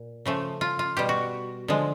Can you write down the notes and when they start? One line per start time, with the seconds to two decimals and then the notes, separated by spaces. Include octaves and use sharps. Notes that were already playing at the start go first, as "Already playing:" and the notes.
Already playing: A#2
0.26 C#3 F3 A3
0.61 F4
0.79 F4
0.97 B2 G3 G4
1.09 F#4
1.68 D3 F3 G#3